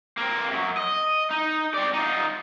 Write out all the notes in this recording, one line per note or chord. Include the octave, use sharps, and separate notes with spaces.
A#3 C4
F#2 F#3
D#5
D#4
C4 D5
D#4 F4